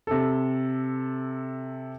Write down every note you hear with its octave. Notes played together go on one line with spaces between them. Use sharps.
C3 A4